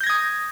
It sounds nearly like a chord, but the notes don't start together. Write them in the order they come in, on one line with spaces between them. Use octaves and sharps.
G6 A#6 G#6 D#6